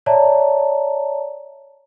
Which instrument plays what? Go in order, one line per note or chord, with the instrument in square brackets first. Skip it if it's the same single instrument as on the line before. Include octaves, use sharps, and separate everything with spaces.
[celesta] C#5 D5 E5 A5 A#5